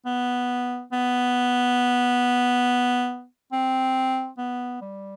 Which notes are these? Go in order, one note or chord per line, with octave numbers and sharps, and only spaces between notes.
B3
B3
C4
B3
G3